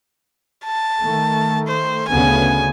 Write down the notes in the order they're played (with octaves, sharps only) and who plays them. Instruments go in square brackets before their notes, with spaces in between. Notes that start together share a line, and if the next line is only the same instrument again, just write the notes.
[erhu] A5
[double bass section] D#3 A3
[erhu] C5
[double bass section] D2 C#3 B3 [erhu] G#5